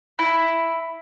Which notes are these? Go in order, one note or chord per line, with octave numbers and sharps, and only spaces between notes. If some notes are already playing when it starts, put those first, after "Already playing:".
E4